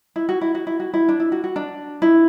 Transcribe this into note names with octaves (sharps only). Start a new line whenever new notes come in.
E4
F#4
E4
F#4
E4
F#4
E4
D4
E4
F#4
F#4
D4
E4